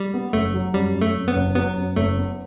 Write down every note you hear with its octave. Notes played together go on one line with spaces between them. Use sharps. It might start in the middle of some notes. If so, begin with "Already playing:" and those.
Already playing: G3
B3
F#1 A3
F#3
F#2 G3
F#2
A3
F#2
B3
F#1
F#3 B3
F#2
F#1 A3
B3